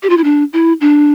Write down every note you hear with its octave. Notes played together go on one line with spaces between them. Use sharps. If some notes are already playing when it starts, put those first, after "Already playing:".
G4
F4
E4
D4
E4
D4